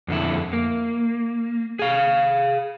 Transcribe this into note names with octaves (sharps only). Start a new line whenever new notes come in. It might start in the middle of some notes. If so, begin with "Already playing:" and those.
F2 D3 E4
A#3
G#4 F5